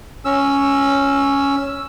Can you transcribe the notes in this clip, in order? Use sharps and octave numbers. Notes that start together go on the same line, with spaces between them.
C#4 E6